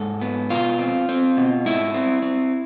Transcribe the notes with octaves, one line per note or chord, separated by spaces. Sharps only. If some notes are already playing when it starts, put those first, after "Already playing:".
Already playing: G#2 A4
B3
B2 F4
C4
C4
B2
G#2 E4
C4
C4